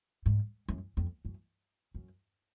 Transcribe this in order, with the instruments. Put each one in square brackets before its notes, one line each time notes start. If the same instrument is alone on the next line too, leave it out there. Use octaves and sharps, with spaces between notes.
[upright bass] G#2
F#2
F2
F#2
F#2